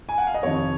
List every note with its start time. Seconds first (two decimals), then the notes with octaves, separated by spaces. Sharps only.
0.09 G#5
0.18 F#5
0.27 F5
0.34 D#5
0.43 F2 C3 D#3 C#5